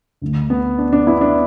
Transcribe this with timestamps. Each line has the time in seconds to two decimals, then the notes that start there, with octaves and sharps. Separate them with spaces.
0.21 D2 D3 A3
0.50 B3
0.78 D4
0.93 D4
1.07 B3 E4
1.21 D4